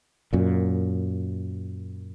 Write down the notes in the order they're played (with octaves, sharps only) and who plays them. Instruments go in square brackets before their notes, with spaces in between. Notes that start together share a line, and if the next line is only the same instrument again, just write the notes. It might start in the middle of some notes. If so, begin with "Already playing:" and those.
[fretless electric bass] F#2 A#2